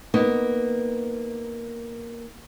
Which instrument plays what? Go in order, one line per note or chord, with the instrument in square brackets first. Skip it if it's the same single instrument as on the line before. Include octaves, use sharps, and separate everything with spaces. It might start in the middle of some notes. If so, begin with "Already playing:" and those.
[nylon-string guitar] A#3 B3 D#4